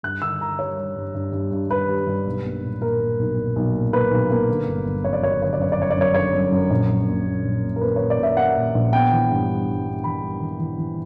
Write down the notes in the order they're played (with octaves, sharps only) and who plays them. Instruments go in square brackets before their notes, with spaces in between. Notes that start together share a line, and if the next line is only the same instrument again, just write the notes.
[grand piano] G2 F#6
D3 E6
D3 A#5
G3 C#5
G3
G2
G2
G2
G2
G2 B4
G3
G2
B1
A#3
A#2
A#2 A#4
A#2
B1
A#2
B1
A#2
A#3 B4
B1
A#3
D3
G1
G1
F#2 C#5
D5
F#3 C#5
D5
D3 C#5
D5
F#2 C#5
D5
G1 C#5
D5
F#2 C#5
D3 C#5
F#2
F#2
A#1
A#1
A#2
A#3
A#1
A#2
A#4
A#3 B4
A#2 C#5
D5
A#2 E5
A#3 F#5
A#2
A#1
B3 G5
E3
G2
G3
G2
B3
E3 B5
G3
E3
E3
E3